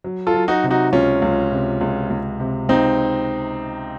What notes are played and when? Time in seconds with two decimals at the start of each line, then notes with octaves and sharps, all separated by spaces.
0.04 F#3
0.27 F4 A4
0.34 F#3
0.48 D#4 F#4
0.64 C3
0.70 D#4 F#4
0.93 C#2 C#4 F4
1.22 C#2
1.52 C3
1.81 C#2
2.10 C#2
2.40 C3
2.69 C#2 C4 D#4